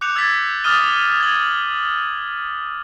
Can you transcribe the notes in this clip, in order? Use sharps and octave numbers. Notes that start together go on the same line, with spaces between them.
D6 F#6 G6 C#7 F7
E6 G#6 A6 B6
D6 D#6 F6 A6 D#7 G7
G#6 F#7